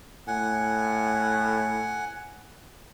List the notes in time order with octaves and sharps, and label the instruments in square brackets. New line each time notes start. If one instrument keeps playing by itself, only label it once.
[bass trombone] A2 [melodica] F#5 G#5